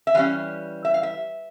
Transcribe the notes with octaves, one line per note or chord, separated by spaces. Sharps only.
E5
E3 G3 C#4 F5
E5
F5
E5